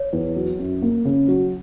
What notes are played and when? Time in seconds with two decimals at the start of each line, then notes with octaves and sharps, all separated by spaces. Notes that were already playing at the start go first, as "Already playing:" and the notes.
Already playing: C#5
0.13 E2
0.36 F#3
0.59 F#2
0.82 A#3
1.05 C#3
1.28 F#3